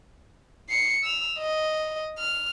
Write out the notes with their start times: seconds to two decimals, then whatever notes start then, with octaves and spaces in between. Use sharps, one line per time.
0.69 C7 C#7
1.04 E6 F7
1.39 D#5
2.18 F6